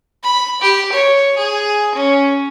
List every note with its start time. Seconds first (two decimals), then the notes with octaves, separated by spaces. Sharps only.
0.23 B5
0.62 G4
0.92 C#5
1.37 G#4
1.95 C#4